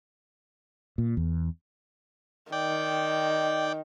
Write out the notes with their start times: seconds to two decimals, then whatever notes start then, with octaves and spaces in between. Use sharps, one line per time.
0.98 A#2
1.17 E2
2.52 D#3 D5 G5